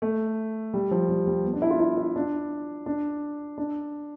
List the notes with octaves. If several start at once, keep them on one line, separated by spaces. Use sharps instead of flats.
A3
G3
F3
G3
G3
B3
D4
E4
F4
E4
E4
D4
D4
D4